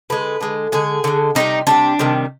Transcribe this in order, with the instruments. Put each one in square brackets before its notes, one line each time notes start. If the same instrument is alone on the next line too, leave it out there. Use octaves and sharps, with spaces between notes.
[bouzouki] D3 G#3 B4
D3 G#3
D3 G#3 G#4
D3 G#3
C3 D#3 G3 D#4
C3 D#3 G3 D4
C3 D#3 G3